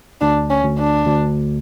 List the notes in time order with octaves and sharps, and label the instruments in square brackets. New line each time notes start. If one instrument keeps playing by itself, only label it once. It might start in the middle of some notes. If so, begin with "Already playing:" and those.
[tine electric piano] D2 [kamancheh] D4
[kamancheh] C#4
[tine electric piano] D2
[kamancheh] D4
[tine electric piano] D2